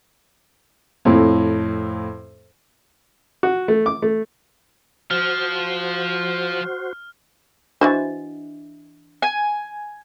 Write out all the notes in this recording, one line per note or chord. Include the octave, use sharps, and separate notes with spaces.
F2 A2
F#4
A3
D6
A3
F3 F#4 C5 F6
E3 D4 F#4 C5 D#5
G#5